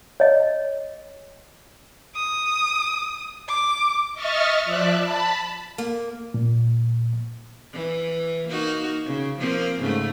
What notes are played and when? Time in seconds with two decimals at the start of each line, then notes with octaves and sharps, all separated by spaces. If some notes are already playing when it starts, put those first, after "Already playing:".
0.20 C#5 D#5
2.15 D#6
3.48 D6
4.14 D#5 E5 C#6 F6 A6
4.65 F3 D5 E5 F#6
4.98 A5 B5
5.78 A#3
6.34 A#2
7.73 E3
8.48 A#3 D#4 F#4
9.05 C#3
9.38 F3 A#3 C4
9.80 G#2 C#3 A3